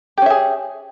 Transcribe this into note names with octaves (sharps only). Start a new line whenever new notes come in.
C#4 G4 G#4 E5